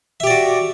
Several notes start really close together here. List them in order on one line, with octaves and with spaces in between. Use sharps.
E5 G4 D5 F#4